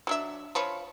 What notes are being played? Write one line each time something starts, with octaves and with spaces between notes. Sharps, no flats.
F#3 D4 E5
F3 B4 C#5